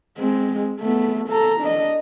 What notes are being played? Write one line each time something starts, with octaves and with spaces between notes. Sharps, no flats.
G#3 C4
A3 B3
A4 A#5
D4 D#5